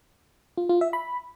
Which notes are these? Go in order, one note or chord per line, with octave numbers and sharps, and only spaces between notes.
F4
F4
E5
B5